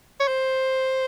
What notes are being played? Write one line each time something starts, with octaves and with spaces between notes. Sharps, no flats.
C#5
C5